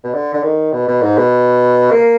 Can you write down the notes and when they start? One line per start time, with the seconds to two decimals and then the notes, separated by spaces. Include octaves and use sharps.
0.04 B2
0.14 D3
0.34 D3
0.43 D#3
0.72 B2
0.88 B2
1.02 G#2
1.17 B2
1.91 A#3